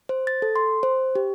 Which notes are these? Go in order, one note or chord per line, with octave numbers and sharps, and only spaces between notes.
C5
A6
A4
C6
C5
G4